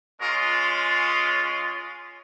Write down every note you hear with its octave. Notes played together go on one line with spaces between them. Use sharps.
G#3 C#4 F4 A#4